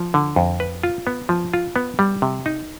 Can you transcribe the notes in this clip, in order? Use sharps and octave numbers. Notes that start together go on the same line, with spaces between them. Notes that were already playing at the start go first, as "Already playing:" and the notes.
Already playing: F3
D3
F2
B4
F4
B3
F3
F4
B3
G3
C3
D#4